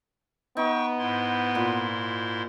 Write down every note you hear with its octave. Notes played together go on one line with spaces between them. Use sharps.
B3 D#4 G5 C#6
G#2 E4 C6
A#2